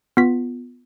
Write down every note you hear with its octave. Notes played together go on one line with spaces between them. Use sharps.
B3 F4 B6